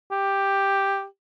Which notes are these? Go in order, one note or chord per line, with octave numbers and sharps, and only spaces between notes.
G4